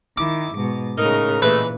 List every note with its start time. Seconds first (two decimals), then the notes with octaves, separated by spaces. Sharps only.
0.18 D#3 E4 D6
0.55 G#2 B2
0.98 A2 C#3 D#4 A#4
1.42 A#2 E3 G#3 A3 B4